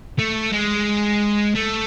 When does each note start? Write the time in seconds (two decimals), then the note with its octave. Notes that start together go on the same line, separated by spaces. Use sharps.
0.19 A3
0.53 G#3
1.55 A3